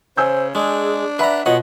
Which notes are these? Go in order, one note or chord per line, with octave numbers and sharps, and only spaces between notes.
C#3 C5 G#5 E6 G6
G#3 D4 G#4
B4 D5 E5 F#5 A#5 B5
B2 F4 C#5 D#5 F#5